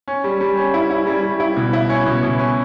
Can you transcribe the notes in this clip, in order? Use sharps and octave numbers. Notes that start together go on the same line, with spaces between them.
C#4
G3
G3
C#4
E4
E4
G3
G3
E4
B2
E4
C#4
B2
B2
C#4